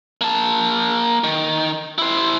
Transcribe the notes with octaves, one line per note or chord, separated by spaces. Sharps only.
A#3 A5
D#3
E4 C5